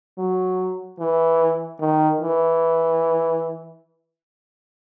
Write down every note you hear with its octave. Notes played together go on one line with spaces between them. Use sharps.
F#3
E3
D#3
E3